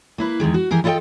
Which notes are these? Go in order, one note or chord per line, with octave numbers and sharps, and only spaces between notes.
A#3 E4 B4
E2 G2 D#3 G#3
F#4
E3 G4 G#4 A#4
E4 F4 A4 C#5 D#5 G5